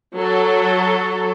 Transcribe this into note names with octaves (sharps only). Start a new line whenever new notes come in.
F#3 A4